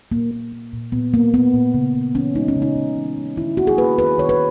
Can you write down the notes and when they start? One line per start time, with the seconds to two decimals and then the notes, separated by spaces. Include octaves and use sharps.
0.12 A#2 A#3
0.31 A#3
0.53 A#3
0.73 A#2
0.92 A#2 B3
1.14 A#3
1.34 A#3 B3
1.54 A#2
1.74 C#3
1.95 C#3
2.15 E3 C#4
2.35 G#3 D#4
2.48 C#4
2.56 C#3
2.62 D#4
2.75 C#3
2.97 E3
3.17 G#3
3.37 D#3 E4
3.57 A#3 F#4
3.67 G#4
3.78 A#3 B4
3.98 D#3 B4
4.18 D#3 C#5
4.29 B4